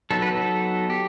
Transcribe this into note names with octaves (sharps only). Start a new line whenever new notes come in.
F#3 B3 D#4 A4
B4
A4
G4